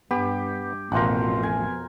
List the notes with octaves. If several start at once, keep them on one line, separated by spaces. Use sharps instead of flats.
G2 B3 G4
A1 F2 B2 F4 A#4 C5 F#5
G#5